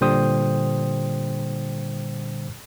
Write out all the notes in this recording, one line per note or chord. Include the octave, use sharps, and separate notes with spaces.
A#2 D3 G3 C5 G5 D#6